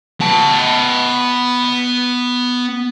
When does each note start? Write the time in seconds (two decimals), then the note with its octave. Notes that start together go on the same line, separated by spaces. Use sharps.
0.20 B3 A5